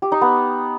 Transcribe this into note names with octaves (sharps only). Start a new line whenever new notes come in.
G4
D#4
B3